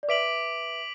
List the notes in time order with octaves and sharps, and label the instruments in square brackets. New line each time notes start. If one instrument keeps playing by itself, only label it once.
[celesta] D5
[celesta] B4 E5 [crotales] D6 B6 D7 F#7